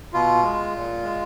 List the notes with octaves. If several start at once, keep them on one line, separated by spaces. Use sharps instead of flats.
B2 F4
G#3
A#2
G#3